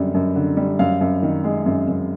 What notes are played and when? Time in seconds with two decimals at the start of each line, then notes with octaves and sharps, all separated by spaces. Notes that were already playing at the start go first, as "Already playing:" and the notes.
Already playing: F#2 D3 G3
0.14 F#2
0.36 D3
0.57 G3
0.79 F#2 F5
1.01 F#2
1.23 D#3
1.44 G#3
1.66 F#2
1.88 F#2